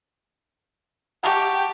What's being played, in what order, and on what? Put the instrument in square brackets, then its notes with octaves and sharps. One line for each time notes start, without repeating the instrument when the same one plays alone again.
[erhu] G4 [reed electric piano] F#5 A5 C#6